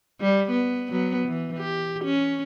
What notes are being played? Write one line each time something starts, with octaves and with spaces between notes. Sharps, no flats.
G3
B3
F#3 B3
E3
G4
C#4